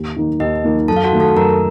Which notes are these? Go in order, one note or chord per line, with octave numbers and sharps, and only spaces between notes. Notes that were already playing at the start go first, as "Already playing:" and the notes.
Already playing: D#2
D#3 A#3 D#4
D#2 D#4 D#5
D#3 A#3 D#4
F#2 A4 A5
F5
F#4 F#5
D#3 A3
A4 A5
F#2 A#4 A#5